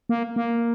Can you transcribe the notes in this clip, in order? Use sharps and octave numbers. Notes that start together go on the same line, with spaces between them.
A#3
A#3